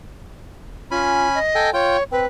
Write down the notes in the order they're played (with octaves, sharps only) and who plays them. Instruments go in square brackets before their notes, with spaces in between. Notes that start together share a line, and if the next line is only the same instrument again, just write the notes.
[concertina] C#4 G#5 B5 [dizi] F4
[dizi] D#5
[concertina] A4 G5 G#5
[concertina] F4 G5 [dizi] C#5
[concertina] C4 [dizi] B4